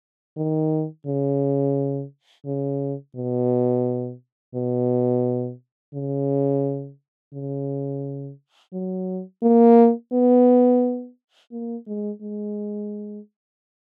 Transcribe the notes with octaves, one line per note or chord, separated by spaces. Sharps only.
D#3
C#3
C#3
B2
B2
C#3
C#3
F#3
A#3
B3
A#3
G#3
G#3